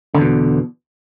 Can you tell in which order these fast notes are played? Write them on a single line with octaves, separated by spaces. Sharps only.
D3 E2 B2